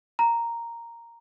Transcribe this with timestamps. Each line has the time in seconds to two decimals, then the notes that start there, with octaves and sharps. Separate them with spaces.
0.19 A#5